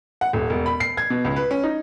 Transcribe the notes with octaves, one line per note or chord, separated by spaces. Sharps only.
F#5
D#1
E1
B5
C7
G#6
B2
C#2
B4
C#4
D#4